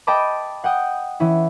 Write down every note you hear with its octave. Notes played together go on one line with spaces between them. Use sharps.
D#5 G5 A5 B5 D6
F#5 G5 D#6
E3 C#4 E4